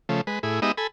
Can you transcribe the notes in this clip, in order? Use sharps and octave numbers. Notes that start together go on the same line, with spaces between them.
C#3 F3 A3
G#3 B4
A2 E4 G#4
G#3 B3 D#4 G4 D#5 E5
A4 G#5 B5